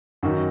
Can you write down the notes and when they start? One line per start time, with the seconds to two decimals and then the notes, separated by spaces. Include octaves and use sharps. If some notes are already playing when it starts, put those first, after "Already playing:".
0.23 F#2 D#3 F#4